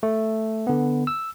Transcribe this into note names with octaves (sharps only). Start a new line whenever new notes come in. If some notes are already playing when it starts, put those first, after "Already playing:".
A3
D3 B3
E6